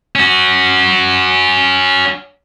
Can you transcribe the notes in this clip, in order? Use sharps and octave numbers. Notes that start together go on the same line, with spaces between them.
C#4 F#4